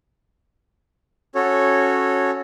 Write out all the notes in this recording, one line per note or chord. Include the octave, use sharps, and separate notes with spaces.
C#4 F#4 A4 C#5